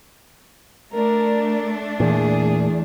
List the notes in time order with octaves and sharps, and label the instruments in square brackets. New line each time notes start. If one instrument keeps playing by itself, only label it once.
[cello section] A3 D4 [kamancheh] A#4
[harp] E2 [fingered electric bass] A#2 [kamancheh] G#4